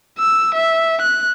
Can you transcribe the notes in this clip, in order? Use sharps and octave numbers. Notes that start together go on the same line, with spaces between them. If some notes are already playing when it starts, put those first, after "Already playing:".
E6
E5
F#6